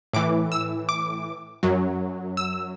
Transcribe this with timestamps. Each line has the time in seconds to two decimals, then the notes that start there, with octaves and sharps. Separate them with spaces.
0.13 A2 E3 D6
0.52 E6
0.89 D6
1.63 F#2 F#3
2.37 E6